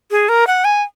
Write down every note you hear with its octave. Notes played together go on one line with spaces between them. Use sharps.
G#4
A#4
F#5
G#5